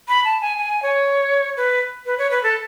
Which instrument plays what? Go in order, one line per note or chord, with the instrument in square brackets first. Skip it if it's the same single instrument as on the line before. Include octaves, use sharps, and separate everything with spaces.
[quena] B5
A5
G#5
G#5
C#5
B4
B4
C#5
B4
A4